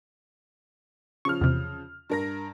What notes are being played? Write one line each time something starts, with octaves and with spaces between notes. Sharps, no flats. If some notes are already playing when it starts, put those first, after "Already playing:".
C#3 F3 C#6 F6
E2 C3
G2 A#4 A#6